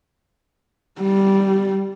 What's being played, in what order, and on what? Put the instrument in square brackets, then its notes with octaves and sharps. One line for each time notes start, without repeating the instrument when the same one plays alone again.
[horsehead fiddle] G3